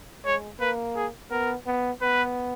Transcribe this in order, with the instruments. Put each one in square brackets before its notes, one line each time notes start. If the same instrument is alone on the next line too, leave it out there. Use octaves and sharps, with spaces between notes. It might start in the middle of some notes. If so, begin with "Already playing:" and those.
[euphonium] G#3 [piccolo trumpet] C#5
[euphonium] A#3 [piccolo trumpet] B4
[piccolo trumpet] G#4
[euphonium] B3 [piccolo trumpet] A#4
[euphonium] B3
[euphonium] B3 [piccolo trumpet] B4